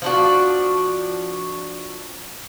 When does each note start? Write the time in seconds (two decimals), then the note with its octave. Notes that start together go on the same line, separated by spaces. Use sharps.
0.02 F3 D4 F#4